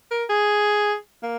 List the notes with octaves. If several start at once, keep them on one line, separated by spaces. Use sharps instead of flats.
A#4
G#4
A#3